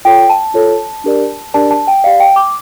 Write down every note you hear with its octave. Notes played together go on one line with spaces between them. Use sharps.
F4 A4 C#5 G5
A5
F4 A4 C#5
D4 G4 A#4 D5
D4 G4 A#4 D5 A5
A5
G5
G4 D5 F5
G5
D6